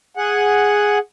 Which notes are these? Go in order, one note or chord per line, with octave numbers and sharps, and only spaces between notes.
G#4 F#5